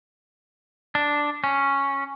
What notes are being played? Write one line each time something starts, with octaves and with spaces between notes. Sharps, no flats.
D4
C#4